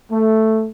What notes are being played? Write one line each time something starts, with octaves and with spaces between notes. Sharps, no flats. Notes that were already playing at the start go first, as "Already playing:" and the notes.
A3